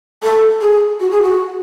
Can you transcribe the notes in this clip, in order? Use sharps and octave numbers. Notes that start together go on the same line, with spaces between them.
A4
G#4
F#4
G#4
F#4